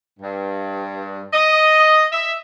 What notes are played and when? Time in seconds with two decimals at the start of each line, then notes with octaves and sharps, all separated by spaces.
0.19 G2
1.33 D#5
2.12 E5